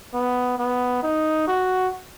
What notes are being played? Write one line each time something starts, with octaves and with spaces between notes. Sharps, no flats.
B3
B3
D#4
F#4